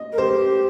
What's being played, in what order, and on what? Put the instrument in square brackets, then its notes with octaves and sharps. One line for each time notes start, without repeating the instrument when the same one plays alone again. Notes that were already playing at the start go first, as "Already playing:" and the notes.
Already playing: [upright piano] D#5
[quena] A#4
[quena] G4 [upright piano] C5